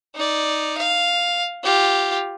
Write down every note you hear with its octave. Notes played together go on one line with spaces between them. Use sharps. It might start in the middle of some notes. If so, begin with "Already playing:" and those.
D#4 D5
F5
F4 G4